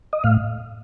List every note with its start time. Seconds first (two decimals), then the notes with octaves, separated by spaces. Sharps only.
0.13 D#5
0.24 A2 F5